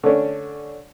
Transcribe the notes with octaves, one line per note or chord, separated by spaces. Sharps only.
D3 A3 C#4 D4